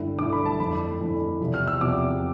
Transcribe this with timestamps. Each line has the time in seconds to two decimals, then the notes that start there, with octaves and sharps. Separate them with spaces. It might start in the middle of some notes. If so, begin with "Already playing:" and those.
Already playing: G2 D3 A3 E4
0.19 G2 D3 A3 E4 D6
0.33 B5
0.45 A5
0.60 F2 E3 A3 D4 B5
1.00 F2 E3 A3 D4
1.41 E2 C3 F3 C4
1.54 F6
1.68 E6
1.81 E2 C3 F3 C4 D6